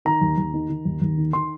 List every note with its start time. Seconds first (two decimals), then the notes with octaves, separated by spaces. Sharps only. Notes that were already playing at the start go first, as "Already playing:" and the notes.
0.05 D#3 A#5
0.21 D#2
0.38 D#2
0.53 D#3
0.70 D#3
0.85 D#2
1.01 D#2
1.18 D#3
1.33 D#3 C6